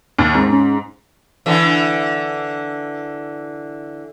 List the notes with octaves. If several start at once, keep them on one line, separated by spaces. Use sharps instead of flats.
D#2
G#2 C4
C#4
D3 E3